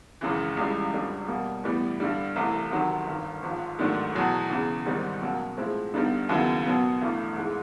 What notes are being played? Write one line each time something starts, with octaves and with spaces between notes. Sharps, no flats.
G#1 F#2 C#3 E3
C#2 C#3 E3 G3
G1 F2 D3 G3
B2 G3 A#3
A2 E3 G3 B3
G2 D3 G3
C2 C3 E3 A3
D2 C3 D#3 F#3
G1 G2 D#3
G#1 G#2 F3
G#2 D#3 F#3 A3 D4
E2 B2 F#3
E2 C#3 E3
G#2 D#3 G3 C4 D#4
B2 F#3 A#3 C#4
A2 F3 G#3 C4 E4
G2 D3 G3 B3 D#4
D#2 C#3 F#3 B3 E4
B2 F#3 B3
A1 G2 E3 A3
G#2 E3 G#3